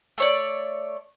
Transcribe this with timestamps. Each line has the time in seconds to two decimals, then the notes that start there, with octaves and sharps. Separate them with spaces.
0.18 A3 C#5 D5